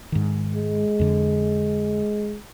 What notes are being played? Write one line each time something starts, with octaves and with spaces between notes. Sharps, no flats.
G#2 D#3
G#3
F2 D3